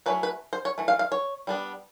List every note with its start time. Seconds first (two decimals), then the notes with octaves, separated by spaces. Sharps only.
0.06 F#3 A3 C#4 E4 B4
0.23 B4
0.53 C5
0.65 C#5
0.78 E3 A3
0.88 F5
0.99 F5
1.12 C#5
1.47 G3 B3 D4